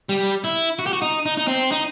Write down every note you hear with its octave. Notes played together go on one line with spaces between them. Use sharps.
G3
E4
F#4
G4
F#4
D#4
D#4
D#4
C4
D#4